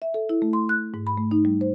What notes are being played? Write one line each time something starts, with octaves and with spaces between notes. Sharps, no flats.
E5
A4
E4
A3
C6
F#6
G#2
B5
A3
D#4
G3
C5